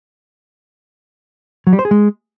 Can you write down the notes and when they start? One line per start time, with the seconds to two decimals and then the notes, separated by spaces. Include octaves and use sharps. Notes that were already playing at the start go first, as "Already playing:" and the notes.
1.67 F#3
1.73 G3
1.79 C5
1.85 G#4
1.91 G#3